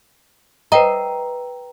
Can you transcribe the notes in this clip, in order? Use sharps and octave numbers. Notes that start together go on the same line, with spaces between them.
B4 D#5 G5 A#5